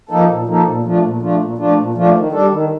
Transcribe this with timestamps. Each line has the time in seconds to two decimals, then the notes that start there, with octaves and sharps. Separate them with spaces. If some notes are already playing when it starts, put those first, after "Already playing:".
0.09 F3 A#3 D#4 A4
0.28 A#2
0.47 F3 A#3 D#4 A4
0.65 A#2
0.84 F3 A3 D4 F4
1.02 A#2
1.21 F3 A3 D4 F4
1.39 A#2
1.58 F3 A3 D4 F4
1.77 A#2
1.95 F3 A3 D4 F4
2.13 D#3
2.32 G3 D4 A4
2.50 D#3